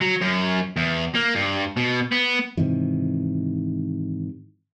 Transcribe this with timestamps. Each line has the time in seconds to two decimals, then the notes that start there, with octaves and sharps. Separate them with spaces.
0.01 F#3
0.21 F#2
0.76 E2
1.15 A#3
1.36 G2
1.77 B2
2.12 B3
2.57 G#2 C3 D#3 E3